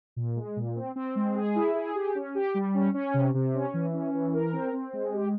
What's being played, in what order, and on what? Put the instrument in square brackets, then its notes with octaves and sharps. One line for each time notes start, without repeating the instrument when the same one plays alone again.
[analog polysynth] A#2
G#3
A#2
C4
C4
G#3
G#4
E4
G#4
G4
C#4
G4
G3
C#4
C#4
C3
C3
C#4
E3
C#4
E3
A#4
C4
C4
G#3
G4